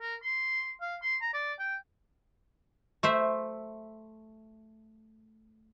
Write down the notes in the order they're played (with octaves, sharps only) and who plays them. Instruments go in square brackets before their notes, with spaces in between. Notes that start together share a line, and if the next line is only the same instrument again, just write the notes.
[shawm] A#4
C6
F5
C6
A#5
D5
G5
[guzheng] A3 C5 E5